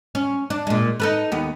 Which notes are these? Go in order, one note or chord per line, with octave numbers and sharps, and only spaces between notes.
C#4
D4
A#2 G#3
D#4 A4 B4
D#2 B3